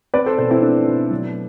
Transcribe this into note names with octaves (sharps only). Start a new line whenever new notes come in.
C4 B4 D5
A4 C5
B2 A4 C5
C4 E4
A3 D4
B2
F#3